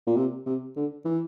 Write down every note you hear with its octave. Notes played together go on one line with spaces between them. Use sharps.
A#2
C3
C3
D3
E3